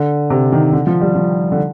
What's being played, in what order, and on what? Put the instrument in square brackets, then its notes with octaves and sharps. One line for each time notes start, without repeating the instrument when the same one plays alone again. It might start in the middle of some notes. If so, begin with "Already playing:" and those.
Already playing: [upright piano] D3
C3
D#3
D3
F3
G3
F3
D3